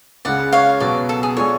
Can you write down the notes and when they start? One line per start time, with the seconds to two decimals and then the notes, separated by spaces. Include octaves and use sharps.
0.25 C#2 C#3 G#3 D5 F#5
0.52 C#5 F5
0.80 B2 F#3 B3 F#4 D5
1.09 A4
1.23 G#4
1.36 G#3 D4 F4 A4 C#5